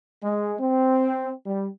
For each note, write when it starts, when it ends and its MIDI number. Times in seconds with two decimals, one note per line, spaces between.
0.21 0.54 56
0.59 1.31 60
1.44 1.67 55